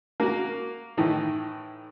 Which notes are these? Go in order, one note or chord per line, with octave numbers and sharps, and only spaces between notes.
A#3 F#4
A2 D#3 E3